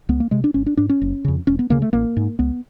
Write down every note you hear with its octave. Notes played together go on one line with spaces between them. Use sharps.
C#2 B3
A#3
C3 G#3
D4
G#1 C#4
D4
G#2 D4
C#4
F#1
F2 C#3
E1 C#4
B3
D2 C#3 A#3
A3
A1 A#3
G#2
C#2 B3